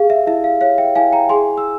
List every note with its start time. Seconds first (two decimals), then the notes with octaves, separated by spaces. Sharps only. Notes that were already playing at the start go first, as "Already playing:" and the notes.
Already playing: G4 G#4 F5
0.10 E5
0.27 E4 E5
0.44 F5
0.61 C#5 F5
0.78 E5 G5
0.95 E4 F5 G#5
1.13 G5 A#5
1.29 G#4 G#5 C6
1.58 E6